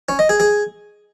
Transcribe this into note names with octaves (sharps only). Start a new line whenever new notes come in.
C#4
D#5
G#4
G#4